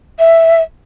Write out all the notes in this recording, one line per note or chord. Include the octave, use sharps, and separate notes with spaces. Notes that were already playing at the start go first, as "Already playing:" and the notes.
E5